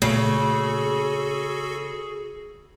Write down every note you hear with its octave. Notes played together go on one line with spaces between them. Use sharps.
A#2 C#3 A3 F#4 G#4 A4